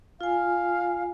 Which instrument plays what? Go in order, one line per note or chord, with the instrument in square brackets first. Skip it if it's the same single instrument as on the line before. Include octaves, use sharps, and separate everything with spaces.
[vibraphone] F4 G#5 [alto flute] F5